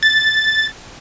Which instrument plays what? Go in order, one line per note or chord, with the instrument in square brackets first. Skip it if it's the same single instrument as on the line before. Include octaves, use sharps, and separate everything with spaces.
[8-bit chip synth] A6